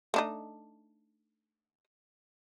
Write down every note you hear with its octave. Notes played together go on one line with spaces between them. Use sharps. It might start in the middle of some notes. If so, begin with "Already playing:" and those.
A3 D4 D#4